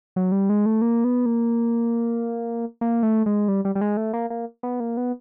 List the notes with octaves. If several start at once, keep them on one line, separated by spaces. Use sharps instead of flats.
F#3
G3
G#3
A3
A#3
B3
A#3
A#3
A3
G#3
G3
G3
G3
G#3
A3
A#3
A#3
B3
A#3
B3